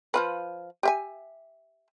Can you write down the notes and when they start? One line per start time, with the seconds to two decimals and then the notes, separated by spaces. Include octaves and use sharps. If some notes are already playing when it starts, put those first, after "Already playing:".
0.14 F3 F4 B4
0.83 G4 E5 G#5